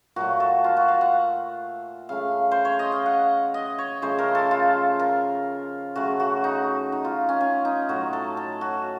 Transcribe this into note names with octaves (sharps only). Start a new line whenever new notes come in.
A#2 F#3 A3 F#4
A4
F4
F#4
F5
F#5
C#3 A3 F5
C5
C#5
D#5
F5
F#5
D#5
C#5
C#3 F3 A3 C5
A#4
A4
F4
A#4
C#3 F#3 A3 F#4
F#4
D#4
D#4
F4
C#4
C#4
D#4
A2 F#3 A3 F#4
A4
A4
F#4